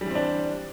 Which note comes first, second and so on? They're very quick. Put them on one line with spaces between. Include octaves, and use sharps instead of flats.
G3 E3 C4 D4